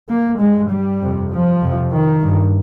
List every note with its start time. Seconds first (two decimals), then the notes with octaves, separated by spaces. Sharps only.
0.09 A#3
0.40 G2 G#3
0.70 G3
1.01 F2 C3
1.31 F3
1.61 F2 C3
1.91 D#3
2.22 G2